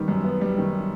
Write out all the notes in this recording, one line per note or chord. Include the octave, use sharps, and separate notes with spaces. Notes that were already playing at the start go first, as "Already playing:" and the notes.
Already playing: D#3 G3 B3
F#2
B3
G3
D#3